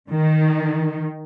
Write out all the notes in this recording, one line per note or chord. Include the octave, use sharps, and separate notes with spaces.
D#3